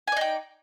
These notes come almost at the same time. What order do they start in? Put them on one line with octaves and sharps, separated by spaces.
G#5 D5 D#4 G5